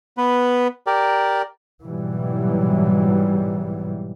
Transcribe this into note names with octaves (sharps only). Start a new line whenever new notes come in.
B3 B4
G4 A#4 D5
G#2 B2 E3 F#3 G3